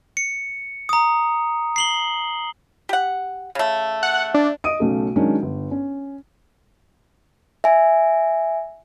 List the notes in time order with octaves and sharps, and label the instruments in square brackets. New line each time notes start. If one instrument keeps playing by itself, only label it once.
[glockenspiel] C#7
A#5 D#6
C7 F#7 G7
[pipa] G4 F#5
C#3 A3
[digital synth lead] F#5
D4
[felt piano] D#5 D#6 D7 D#7
B1 C#3 A3
D#3 F#3 G#3 C#4 D4
G1
C#4
[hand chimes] E5 G#5